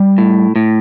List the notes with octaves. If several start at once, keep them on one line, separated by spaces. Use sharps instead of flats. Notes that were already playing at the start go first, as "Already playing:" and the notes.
Already playing: G3 D5
A2
A2